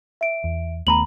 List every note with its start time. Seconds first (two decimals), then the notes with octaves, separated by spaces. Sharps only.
0.21 E5 D7
0.44 E2
0.87 D#2 A3 B3 A#5 B5 F#7